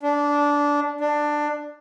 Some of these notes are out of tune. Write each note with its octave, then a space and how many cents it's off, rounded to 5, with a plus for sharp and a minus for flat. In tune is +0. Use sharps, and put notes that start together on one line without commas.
D4 -15
D4 +15